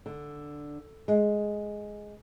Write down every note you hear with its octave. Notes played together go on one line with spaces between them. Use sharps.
D3
G#3